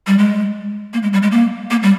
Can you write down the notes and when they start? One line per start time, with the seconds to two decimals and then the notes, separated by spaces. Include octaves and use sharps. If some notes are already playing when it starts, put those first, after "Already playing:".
0.07 G3
0.18 G#3
0.94 A#3
1.03 G#3
1.13 G3
1.23 G#3
1.32 A#3
1.71 A#3
1.83 G3